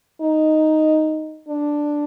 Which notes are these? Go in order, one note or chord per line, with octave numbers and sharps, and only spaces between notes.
D#4
D4